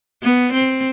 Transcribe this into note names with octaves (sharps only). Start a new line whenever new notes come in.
B3
C4